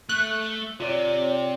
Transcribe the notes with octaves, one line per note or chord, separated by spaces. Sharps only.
A3 F#6
C3 F4 C#5 D5